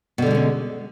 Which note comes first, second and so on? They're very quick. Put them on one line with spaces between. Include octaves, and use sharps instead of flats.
B2 D3 G3 G#3 C#4